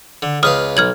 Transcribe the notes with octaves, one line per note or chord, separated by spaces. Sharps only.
D3
C#2 B4 F5 D#6 F6
B1 F6 G#6 F#7